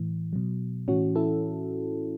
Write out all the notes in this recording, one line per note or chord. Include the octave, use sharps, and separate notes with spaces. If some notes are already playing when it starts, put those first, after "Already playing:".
Already playing: A2 E3
B2 F#3
A2 E3 C#4 F#4
E4 A4